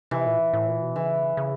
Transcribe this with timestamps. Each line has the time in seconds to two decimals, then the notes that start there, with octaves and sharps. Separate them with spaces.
0.11 C3 E3
0.26 A#2
0.53 A2
0.68 A#2
0.82 B2
0.96 C#3 E3
1.37 C#3